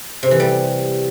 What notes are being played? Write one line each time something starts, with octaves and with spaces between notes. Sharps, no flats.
C3
E3
G3